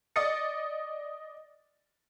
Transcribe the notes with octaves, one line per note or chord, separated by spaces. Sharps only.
D5 D#5 D#6 A6 C#7